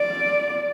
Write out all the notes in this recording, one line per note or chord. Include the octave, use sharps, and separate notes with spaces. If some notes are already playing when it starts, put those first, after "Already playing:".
Already playing: D5